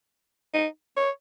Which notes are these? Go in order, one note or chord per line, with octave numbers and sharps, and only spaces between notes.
D#4
C#5